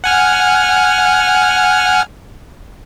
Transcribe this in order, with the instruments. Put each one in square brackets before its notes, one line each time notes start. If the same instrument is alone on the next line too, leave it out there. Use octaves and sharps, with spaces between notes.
[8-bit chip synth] F#5 G#5 F6